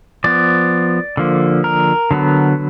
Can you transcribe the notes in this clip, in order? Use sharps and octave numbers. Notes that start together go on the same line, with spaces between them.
F3 B3 D5
D3 F3 A#3
A#4
D3 F#3 B3